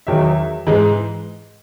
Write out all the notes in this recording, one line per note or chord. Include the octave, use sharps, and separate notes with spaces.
E2 D#3 F#3 E5
G#2 E3 G#3